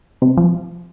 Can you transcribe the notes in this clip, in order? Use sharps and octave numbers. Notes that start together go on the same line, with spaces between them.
C3
F3